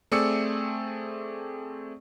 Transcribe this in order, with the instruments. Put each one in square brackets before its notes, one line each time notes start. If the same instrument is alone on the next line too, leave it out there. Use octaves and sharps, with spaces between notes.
[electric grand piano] A3 C4 G#4 D5 E6 C#7